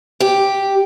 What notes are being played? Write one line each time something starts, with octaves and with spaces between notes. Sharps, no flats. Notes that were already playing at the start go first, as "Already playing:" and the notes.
G4